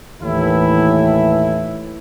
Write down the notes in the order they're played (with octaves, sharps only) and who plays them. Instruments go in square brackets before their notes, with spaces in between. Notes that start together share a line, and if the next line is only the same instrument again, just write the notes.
[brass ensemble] D#2 A2 E3 E4